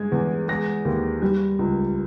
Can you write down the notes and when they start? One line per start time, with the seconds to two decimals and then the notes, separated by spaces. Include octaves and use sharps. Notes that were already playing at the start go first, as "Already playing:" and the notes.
Already playing: G2 G#3 G#6
0.12 E2
0.48 G#3 A#6
0.85 D#2
1.22 G3
1.59 C#2